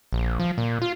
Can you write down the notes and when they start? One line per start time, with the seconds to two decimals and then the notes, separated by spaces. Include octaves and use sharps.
0.13 A#1
0.40 F3
0.58 A#2
0.82 F4